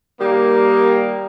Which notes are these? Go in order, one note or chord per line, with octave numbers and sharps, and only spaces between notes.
D#3 G3 A#3